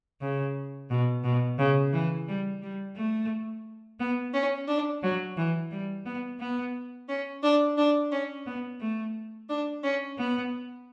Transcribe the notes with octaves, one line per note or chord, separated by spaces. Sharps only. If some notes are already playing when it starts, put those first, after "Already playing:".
C#3
B2
B2
C#3
E3
G3
G3
A3
B3
C#4
D4
F#3
E3
G3
B3
B3
C#4
D4
D4
C#4
B3
A3
D4
C#4
B3